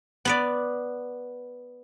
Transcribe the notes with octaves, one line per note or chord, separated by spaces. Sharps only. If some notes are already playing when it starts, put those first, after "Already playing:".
B3 B4 D5